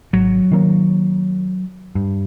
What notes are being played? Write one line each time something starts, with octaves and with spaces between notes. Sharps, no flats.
G#1 F#3
D#3 A#3 C#4
G2